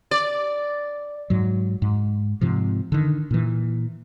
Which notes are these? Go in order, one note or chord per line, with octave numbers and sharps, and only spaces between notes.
D5
G#2 F#3
G#2
G#2 C3 F3
D3 D#3
A#2 E3